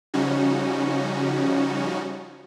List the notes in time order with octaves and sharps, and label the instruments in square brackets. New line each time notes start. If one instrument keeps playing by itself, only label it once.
[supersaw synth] C#3 F3 G3 C#4 D#4 F#4